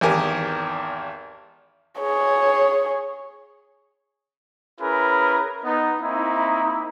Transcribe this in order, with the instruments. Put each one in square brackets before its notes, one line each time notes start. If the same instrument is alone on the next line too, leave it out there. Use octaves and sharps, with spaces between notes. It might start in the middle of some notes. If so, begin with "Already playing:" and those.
[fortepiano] G#1 E2 G4 A#4 G#5
[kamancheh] G#4 C#5
[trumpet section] C#4 E4 G#4 A#4 B4
B3 D#4
A#3 C4 D#4 E4